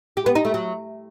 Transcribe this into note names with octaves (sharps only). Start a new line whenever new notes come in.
G4
B3
D#4
A3
F#3